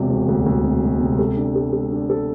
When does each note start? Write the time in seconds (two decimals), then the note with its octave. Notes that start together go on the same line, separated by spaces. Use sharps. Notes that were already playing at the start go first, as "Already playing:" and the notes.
Already playing: E1 C3
0.10 E1
0.28 D2
0.46 D2
0.64 C3
0.83 G#3
1.00 C3
1.19 A4
1.37 D4
1.56 A4
1.73 A4
1.92 D4
2.09 A4